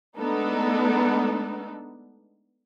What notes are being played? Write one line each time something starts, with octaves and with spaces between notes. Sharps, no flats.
G#3 A3 B3 D4 D#4 A4